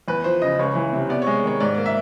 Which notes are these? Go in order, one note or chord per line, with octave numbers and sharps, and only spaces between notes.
E2 B4
F3 C5
C#3 D#5
C#2 C#5
E3
C3
B3 D5
G#3 C#5
D#3 C#5
G#2 D5
A#3
E5